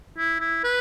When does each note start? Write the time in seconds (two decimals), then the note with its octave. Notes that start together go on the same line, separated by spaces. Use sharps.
0.18 E4
0.41 E4
0.64 B4